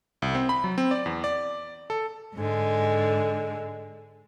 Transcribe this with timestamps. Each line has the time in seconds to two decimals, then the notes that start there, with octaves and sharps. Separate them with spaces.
0.22 C2
0.35 C4
0.49 B5
0.64 F#3
0.78 C4
0.91 D5
1.06 E2
1.24 D5
1.90 A4
2.36 G#2 D3 G#3